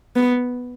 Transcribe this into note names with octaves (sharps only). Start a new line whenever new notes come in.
B3